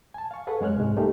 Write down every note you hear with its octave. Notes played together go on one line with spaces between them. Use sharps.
G#5 A5
F5 C#6
G#4 A4 B4 F#5
F#2 G#3 G#4 C#5 F6 F#6
C2 G#2 G#3
G3 A3 A#3 D#4 G4